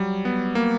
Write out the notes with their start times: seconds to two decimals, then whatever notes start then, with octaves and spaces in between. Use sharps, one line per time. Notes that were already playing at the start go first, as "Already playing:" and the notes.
Already playing: F#3 G3
0.25 B3
0.55 A#3